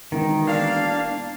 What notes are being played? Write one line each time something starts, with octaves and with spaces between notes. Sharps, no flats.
E1 D#3
A#3 D4 F5